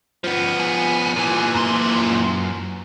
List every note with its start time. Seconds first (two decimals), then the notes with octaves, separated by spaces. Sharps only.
0.24 F3 B3
0.60 G#4
1.17 A#2 E3
1.54 F#2 C6